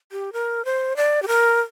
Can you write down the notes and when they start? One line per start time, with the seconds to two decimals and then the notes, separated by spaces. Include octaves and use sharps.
0.12 G4
0.33 A#4
0.65 C5
0.97 D5
1.22 G4
1.28 A#4